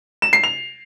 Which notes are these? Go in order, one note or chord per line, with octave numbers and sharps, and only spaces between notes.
E7
C7
F7